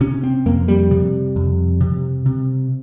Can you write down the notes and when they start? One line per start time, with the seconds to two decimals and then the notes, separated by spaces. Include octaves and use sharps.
0.01 C3 C#4
0.23 C4
0.46 F2 A#3
0.68 G3
0.91 C3
1.36 F2
1.81 C3
2.26 C3